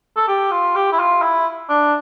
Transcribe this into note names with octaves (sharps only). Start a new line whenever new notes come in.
A4
G4
F4
G4
E4
F4
E4
D4